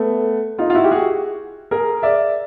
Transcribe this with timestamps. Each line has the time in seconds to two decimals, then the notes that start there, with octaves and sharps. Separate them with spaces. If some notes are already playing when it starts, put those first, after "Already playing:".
Already playing: A3 B3
0.58 D#4 F4
0.70 F4
0.75 E4 F#4
0.84 G4
0.91 F#4 G#4
1.71 G#4 A#4
2.03 D5 E5